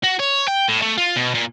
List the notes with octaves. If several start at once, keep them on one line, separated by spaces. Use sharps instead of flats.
F#4
C#5
G5
A2
A3
F4
B2
A#2